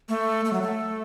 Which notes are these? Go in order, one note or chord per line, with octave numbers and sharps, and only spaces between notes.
A3
A3
F#3
A3